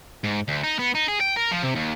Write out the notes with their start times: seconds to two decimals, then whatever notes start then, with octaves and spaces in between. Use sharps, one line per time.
0.24 G#2
0.48 D2
0.63 D#4
0.79 B3
0.95 D#4
1.08 G#4
1.21 G5
1.37 A#4
1.52 F3
1.63 C3
1.76 D#2